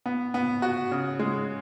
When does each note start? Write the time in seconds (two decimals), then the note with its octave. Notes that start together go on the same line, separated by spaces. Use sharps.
0.06 B3
0.34 B3
0.62 F#4
0.91 C#3
1.19 G#3